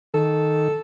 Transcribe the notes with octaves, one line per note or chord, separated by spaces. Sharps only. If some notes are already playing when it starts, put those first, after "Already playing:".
D#3 A4